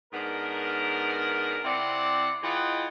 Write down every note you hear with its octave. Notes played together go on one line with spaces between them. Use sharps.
G#2 B3 D4 A#4
C3 C4 E4 D5 F#5 C6
E3 G#3 F4 D#5 F#5 G5